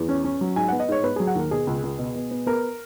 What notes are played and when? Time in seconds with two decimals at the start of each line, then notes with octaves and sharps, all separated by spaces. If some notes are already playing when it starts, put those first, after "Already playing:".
Already playing: E2
0.09 C#4
0.24 C#4
0.41 F#3
0.56 G#2 G#5
0.68 B3 F#5
0.80 D#5
0.88 G#2 C#5
1.03 B3 B4
1.16 F#3 G#4
1.27 F#5
1.35 D#2 A#4
1.51 B2 G#4
1.67 C#2
1.83 C#2
1.99 B2
2.15 B2
2.31 B3
2.46 B3 A#4